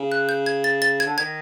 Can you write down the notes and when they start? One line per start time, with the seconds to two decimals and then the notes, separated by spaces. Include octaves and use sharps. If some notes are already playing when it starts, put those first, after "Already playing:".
Already playing: C#3
0.12 F#6
0.29 G6
0.46 G#6
0.64 A6
0.82 A6
1.00 G#6
1.06 D3
1.18 D#3 G#6